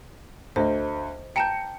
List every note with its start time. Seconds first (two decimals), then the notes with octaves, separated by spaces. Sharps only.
0.56 D2 C5 D#5
1.36 G5 A5 A#5 G6 C#7